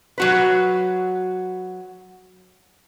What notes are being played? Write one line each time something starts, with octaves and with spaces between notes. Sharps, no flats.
F#3 F#4 B4